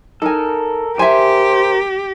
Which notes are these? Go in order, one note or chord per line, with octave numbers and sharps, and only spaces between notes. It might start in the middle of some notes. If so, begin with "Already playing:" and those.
D#4 A4 A#4 G#5
G4 C5 E5 G#5